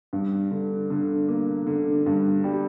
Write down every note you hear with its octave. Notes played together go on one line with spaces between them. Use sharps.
G2
D3
D3
A#3
D3
G2
G3